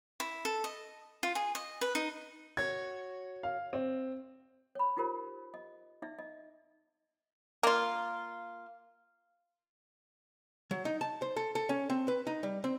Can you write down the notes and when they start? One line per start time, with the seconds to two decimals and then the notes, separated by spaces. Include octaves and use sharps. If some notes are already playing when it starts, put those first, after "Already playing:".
0.20 E4
0.45 A4
0.64 D#5
1.23 F4
1.35 G#4
1.55 D#5
1.81 B4
1.95 D#4
2.57 F#4 C#5 G#6
3.43 F5
3.73 C4
4.75 C#5 B5
4.97 D#4 F4 G4 A#4 C5
5.54 D#5
6.02 D#4 D5 E5
6.19 D#5
7.63 A#3 F4
10.71 F#3
10.85 D#4
11.01 A5
11.22 C5
11.36 A4
11.55 A4
11.69 C#4
11.90 C4
12.08 B4
12.27 D#4
12.43 G3
12.64 C4